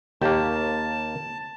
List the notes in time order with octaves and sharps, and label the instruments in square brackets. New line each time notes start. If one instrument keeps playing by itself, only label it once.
[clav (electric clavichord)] D#2 A#3 [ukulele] G4 [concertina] A5